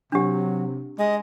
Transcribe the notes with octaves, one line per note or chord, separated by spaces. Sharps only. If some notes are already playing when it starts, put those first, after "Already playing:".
C3 F#3 D4 G4
G#3 D#5